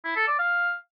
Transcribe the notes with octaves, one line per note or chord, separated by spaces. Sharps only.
E4
A4
D5
F5